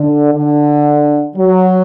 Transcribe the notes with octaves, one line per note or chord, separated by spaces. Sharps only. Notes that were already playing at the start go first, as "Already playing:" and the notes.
Already playing: D3
D3
F#3